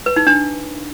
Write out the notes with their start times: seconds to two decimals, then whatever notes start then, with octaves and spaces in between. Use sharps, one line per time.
0.06 B4
0.16 D#4
0.27 D4